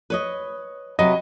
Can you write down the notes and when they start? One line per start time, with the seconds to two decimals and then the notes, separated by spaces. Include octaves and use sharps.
0.10 B4 C#5 D#5
0.99 C3 F#3 B4 D#5